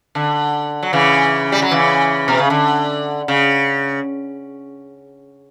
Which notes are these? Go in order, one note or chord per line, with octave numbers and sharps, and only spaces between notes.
D3
F#3
C#3 E3
G3
F#3
C#3 E3
B2
C#3
D3
C#3